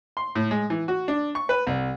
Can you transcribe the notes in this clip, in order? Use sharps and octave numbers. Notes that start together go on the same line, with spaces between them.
C6
A2
G#3
E3
F#4
D4
C#6
B4
C2